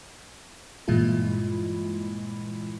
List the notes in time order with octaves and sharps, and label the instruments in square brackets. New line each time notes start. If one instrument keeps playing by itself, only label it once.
[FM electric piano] G2 A#2 E3 G#3 E4 F4